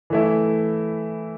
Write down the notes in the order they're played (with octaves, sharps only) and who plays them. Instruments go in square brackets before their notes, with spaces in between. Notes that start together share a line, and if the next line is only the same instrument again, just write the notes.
[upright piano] E3 A3 E4